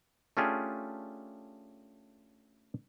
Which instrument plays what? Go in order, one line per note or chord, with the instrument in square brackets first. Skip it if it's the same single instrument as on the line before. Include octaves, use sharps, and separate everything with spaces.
[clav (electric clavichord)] A3 C#4 D4 F4 G4 G#4